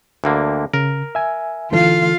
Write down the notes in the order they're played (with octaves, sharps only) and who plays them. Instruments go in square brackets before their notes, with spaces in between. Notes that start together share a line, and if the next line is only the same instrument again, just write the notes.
[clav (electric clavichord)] D2 D3 A#3
[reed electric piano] C#3 [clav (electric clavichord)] A#4
[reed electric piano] E5 G#5
[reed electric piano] D3 E3 A4 [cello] F4 F5